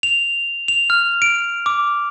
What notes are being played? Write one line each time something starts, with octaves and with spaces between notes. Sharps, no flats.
F7
F7
F6
D7
D6